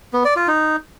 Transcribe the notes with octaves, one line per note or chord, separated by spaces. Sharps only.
B3
D5
F4
D#4